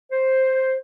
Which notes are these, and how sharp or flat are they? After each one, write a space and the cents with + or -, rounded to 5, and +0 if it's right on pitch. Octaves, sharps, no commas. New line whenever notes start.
C5 +5